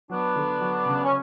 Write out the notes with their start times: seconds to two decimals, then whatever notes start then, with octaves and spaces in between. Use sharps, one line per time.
0.10 F#3 B3 D4
0.36 D3
0.61 F#3
0.86 C#3
1.03 C#4